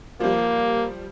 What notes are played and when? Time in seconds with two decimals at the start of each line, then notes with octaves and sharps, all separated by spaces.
0.20 F3 G3 A#3